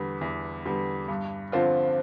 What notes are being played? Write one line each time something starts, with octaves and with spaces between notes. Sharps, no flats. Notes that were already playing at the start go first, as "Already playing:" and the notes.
Already playing: E2 D3 G3 B3
E2
D3 G3 B3
G2
D3 F3 C4 F4